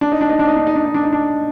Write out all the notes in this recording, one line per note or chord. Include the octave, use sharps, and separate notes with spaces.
D4
D#4
D4
D#4
D4
D#4
D4
D#4
D4
D#4
D4
D#4
D4